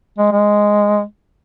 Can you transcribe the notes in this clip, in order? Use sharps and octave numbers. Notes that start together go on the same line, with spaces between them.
G#3
G#3